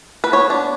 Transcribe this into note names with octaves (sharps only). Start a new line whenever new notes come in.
B4
B3 C#5
D4